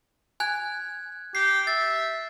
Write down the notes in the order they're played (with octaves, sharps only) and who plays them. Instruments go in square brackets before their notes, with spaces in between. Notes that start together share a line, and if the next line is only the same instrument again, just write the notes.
[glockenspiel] G#5 F#6 G#6
[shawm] G4 [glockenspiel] C7
[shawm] E5 [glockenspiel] A6